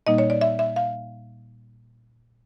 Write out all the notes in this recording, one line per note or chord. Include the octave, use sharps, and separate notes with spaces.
A#2 G3 A#3 D#4 D#5
C#5
D5
E5
E5
F5